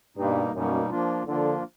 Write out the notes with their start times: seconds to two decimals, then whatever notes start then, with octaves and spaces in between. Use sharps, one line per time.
0.17 G2 B2 G3 A#3 D#4
0.53 F#2 B2 G3 A#3 D#4
0.90 F3 A#3 D4 F4
1.26 D3 F3 A#3 D4 F4